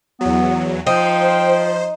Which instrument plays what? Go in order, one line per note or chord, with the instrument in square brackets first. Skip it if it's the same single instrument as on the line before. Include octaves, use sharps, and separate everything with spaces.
[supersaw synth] E2 F#3 [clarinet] B3
[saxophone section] F3 [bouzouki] D#4 [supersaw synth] C5 [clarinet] G5